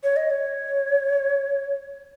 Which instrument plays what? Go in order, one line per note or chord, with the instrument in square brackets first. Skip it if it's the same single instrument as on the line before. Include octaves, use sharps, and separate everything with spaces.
[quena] C#5
D#5
C#5